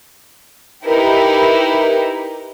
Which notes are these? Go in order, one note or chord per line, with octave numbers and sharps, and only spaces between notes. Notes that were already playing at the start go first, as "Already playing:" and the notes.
D#4 E4 G4 A#4 B4